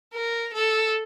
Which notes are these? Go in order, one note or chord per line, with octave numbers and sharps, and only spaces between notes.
A#4
A4